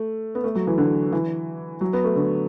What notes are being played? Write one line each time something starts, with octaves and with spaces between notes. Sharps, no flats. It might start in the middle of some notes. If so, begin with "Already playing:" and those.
Already playing: A3
B3
A3
F#3
E3
D3
E3
F#3
B3
A3
D3